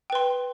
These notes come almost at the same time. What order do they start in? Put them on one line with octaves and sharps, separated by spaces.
G5 B4 C6